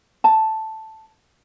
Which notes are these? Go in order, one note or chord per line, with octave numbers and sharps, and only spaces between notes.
A5